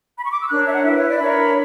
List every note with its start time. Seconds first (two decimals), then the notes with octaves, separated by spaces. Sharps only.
0.17 B5
0.24 C#6
0.33 D6
0.41 E6
0.50 D4 A#4 C#5 F#6
0.66 E5
0.73 F#5
0.84 E4 B4 E5
0.96 C#5
1.08 D5
1.19 D4 A#4 C#5 B5